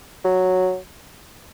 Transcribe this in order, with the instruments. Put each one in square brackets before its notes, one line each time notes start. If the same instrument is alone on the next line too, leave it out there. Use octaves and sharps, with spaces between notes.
[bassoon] F#3